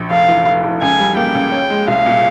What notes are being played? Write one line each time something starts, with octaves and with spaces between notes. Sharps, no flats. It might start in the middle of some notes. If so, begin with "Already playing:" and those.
Already playing: A#1
F1 F5
E3
F1
F1
C#2 G#5
G3
A#3 G5
C#2
C#4
G#3
C2 F5
A#2